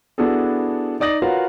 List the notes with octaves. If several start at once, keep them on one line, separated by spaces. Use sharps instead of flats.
B3 D4 E4 F#4 G#4 A4
D#4 D5 D#6 A#6 F#7
F4 F#4 A#4 B4 C#5 F5